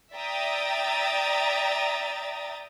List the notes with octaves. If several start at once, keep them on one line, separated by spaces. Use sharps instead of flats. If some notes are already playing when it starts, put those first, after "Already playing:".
D5 E5 G5 A#5 D#6 A6